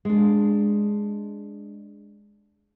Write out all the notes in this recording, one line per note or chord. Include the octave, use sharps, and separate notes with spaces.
G#3 D4